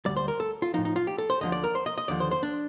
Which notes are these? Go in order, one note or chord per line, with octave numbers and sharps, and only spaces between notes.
D2 C3 G3 D5
C5
A#4
A4
F4
A2 F3 D#4
D#4
F4
G4
A4
C5
D2 D3 F3 D#5
D5
A#4
C5
D#5
D#5
D#2 D3 F3 D5
C5
C5
D4